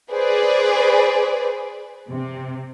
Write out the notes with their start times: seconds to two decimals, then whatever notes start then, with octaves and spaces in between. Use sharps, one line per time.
0.12 G#4 B4 C5 D5
2.09 C3